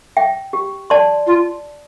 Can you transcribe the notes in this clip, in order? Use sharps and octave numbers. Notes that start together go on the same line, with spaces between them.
E5 G5
G4
D5 A5 C6
F4